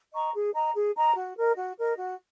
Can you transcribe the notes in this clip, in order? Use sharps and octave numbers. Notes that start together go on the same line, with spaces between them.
D#5 A#5 C#6
G#4
D#5 A#5
G#4
D#5 A#5
F#4
A#4 D#5
F#4
A#4 D#5
F#4